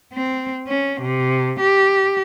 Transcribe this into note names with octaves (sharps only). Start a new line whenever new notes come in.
C4
C#4
C3
G4